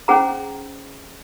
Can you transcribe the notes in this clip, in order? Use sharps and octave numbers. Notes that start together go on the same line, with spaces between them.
C#4 G#4 C5 F#5 A#5